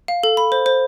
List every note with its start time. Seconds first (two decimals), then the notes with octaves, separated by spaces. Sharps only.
0.08 F5
0.23 A4
0.37 B5
0.52 C5
0.66 C5